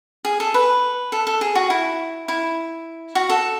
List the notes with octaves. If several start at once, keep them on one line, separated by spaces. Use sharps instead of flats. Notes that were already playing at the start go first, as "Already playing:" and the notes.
G#4
A4
B4
A4
A4
G#4
F#4
E4
E4
F#4
A4